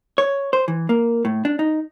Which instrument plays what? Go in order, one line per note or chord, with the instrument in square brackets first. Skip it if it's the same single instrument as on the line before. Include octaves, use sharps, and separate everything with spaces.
[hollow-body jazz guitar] C#5
C5
E3
A#3
A2
D4
D#4